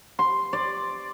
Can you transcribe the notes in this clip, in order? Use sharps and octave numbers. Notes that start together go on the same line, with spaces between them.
C6
D5